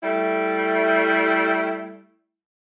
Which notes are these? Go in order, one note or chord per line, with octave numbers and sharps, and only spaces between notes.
G3 A3 E4